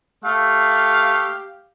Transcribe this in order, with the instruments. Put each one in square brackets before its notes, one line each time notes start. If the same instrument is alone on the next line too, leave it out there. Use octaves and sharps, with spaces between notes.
[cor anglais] A3 [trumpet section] G4 F5